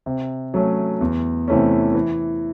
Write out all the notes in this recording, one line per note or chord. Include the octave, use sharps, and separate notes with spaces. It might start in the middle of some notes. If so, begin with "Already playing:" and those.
C3
F#3 A3 C#4
E2
C3 E3 A3 C#4
E3